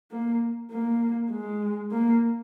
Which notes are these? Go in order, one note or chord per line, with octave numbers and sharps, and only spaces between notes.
A#3
A#3
G#3
A#3